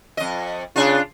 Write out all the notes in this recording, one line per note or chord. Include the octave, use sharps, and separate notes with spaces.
F2 D#5
C#3 D4 F4